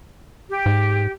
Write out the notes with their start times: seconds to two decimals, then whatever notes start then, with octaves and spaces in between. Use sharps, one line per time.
0.49 G4
0.66 G#2